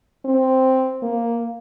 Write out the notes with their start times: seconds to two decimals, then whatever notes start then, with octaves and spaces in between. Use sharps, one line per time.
0.25 C4
1.02 A#3